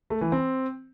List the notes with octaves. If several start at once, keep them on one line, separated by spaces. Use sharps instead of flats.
A3
E3
C4